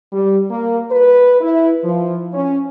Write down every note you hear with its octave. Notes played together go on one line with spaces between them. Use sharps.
G3
A#3
B4
E4
F3
C#4